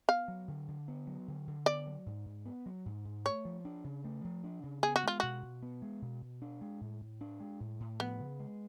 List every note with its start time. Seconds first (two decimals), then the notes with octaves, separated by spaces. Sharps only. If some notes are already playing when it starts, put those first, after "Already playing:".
0.08 B3 F5
0.28 F#3
0.48 D3
0.68 D3
0.88 B3
1.07 F#3
1.28 D3
1.47 D3
1.66 B3 D5
1.87 F#3
2.06 G#2
2.26 G#2
2.45 B3
2.66 F#3
2.86 G#2
3.05 G#2
3.25 A3 C#5
3.45 F3
3.65 D4
3.84 C#3
4.04 A3
4.24 F3
4.44 D4
4.63 C#3
4.83 B3 G#4
4.96 F#4
5.04 G#3 F4
5.20 B2 F#4
5.43 B2
5.62 B3
5.82 G#3
6.02 B2
6.22 B2
6.42 D4
6.61 G#3
6.81 A2
7.01 A2
7.21 D4
7.40 G#3
7.60 A2
7.80 A2
8.00 F3 B3
8.19 C#3
8.39 G#3